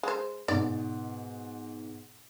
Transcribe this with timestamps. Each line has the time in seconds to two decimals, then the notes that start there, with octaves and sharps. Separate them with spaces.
0.03 G#3 C5
0.48 G#2 B2 D5